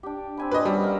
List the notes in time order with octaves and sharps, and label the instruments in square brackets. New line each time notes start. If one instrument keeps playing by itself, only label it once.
[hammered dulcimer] D4 G4
C4 G#5 B5
[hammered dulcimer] A#2 [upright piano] B4 D#5
[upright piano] G3 [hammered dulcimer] B3 C#4 A4
[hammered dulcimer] A#4 F5